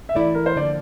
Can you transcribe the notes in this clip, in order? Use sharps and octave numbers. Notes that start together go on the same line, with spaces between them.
E5
E3 A3 E4 D5
A#4
C5
D3 F3 A#3 D5